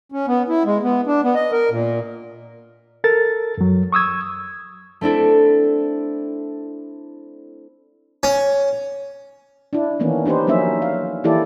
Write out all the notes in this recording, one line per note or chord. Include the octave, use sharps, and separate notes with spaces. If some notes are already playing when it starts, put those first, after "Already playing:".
C#4
B3
E4
G#3
B3
D4
B3
D#5
A#4
A#2
A4 A#4 A6
F#2 F#3
C#6 D#6 E6 G#6
A3 C4 D4 E4 A4
C#4
D4 E4
D#3 E3 A#3 B3 C#4
D4 D#4 G4 B4 C5
F3 F#3 A#3 C#4 D#4 E5
F5
E3 A#3 E4 G4 A4 D5